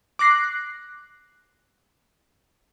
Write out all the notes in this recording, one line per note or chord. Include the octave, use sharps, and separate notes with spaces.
D6 F#6 A#6 C7